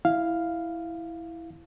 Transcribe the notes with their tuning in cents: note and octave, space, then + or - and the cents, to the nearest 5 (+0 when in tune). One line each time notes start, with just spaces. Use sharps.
E4 +0 F5 +0